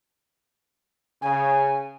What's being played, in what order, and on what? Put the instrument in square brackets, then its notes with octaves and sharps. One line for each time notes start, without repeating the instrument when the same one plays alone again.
[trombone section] C#3 [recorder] G#5